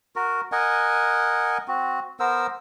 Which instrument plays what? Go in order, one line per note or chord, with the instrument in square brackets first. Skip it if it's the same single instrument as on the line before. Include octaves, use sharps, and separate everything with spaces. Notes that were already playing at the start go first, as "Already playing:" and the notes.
[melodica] F#4 A#4
A#4 D#5 F#5 G#5
C4 F#4
B3 A#4 C5 E6